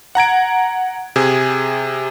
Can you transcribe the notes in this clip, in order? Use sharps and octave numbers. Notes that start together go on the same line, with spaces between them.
F#5 A#5 G#6 D7
C3 G#4 G#6